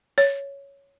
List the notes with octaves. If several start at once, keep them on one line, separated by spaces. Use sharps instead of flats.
C#5